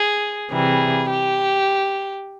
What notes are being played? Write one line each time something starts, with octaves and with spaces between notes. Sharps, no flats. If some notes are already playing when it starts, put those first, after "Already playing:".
Already playing: G#4
C3 E3 G3 G#4
G4